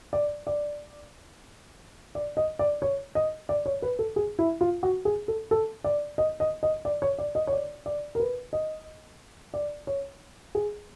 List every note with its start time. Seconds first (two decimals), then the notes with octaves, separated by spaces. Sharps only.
0.13 D5
0.47 D5
2.15 D5
2.37 D#5
2.59 D5
2.82 C#5
3.15 D#5
3.49 D5
3.66 C#5
3.82 B4
3.99 A4
4.16 G#4
4.39 E4
4.61 F4
4.83 F#4
5.05 G#4
5.28 A4
5.51 A4
5.84 D5
6.18 D#5
6.40 D#5
6.63 D#5
6.85 D5
7.02 C#5
7.19 D5
7.35 D#5
7.47 C#5
7.53 D5
7.86 D5
8.15 A#4
8.20 B4
8.53 D#5
9.54 D5
9.87 C#5
10.55 G#4